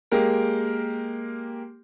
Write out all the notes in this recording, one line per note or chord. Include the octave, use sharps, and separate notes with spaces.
G#3 A#3 G4 A#4